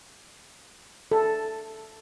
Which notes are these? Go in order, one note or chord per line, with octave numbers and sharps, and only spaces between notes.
A4